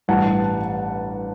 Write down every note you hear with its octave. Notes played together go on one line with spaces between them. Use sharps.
A1 G2 E3 G3 F#5 A5